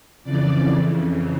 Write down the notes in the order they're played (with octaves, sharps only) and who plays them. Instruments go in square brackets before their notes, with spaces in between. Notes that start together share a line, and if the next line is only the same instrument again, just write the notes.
[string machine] F2 C#3 E3 D5